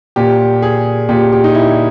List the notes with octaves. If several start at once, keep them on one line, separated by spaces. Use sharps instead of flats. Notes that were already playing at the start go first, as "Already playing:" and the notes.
A#2 G4
G#4
A#2 G4
G4
D#4
E4